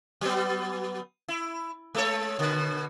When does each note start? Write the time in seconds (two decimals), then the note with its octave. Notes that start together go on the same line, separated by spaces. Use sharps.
0.21 F#3 B3
1.28 E4
1.95 G#3 A4 C#5
2.39 B2 D3